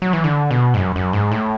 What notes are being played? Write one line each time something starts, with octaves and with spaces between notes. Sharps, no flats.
F#3
E3
D3
B2
G#2
F#2
F#2
G#2
A2